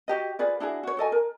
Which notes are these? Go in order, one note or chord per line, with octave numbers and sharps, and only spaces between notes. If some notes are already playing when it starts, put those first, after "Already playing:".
F#4 G4 D#5
F4 G#4 B4 D5
D4 E4 F#4 G#4
F#4 C#5
F#4 A4 D#5 G#5
A#4